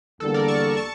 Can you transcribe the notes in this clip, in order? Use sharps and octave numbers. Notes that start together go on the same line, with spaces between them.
E2 D3 G3 A#3 A4
A#4 D5
A5 C#6
A5 C#6